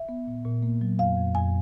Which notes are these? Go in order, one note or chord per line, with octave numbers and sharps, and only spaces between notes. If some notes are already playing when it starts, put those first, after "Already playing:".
Already playing: E5
B3
A#2
A#2
A#3
F#3
F2 F5
F2
F2 G#5